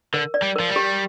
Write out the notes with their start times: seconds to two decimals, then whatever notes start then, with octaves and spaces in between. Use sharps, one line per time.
0.14 D3 A#4
0.34 D5
0.42 G3
0.56 F3 A#4
0.70 G3
0.76 G4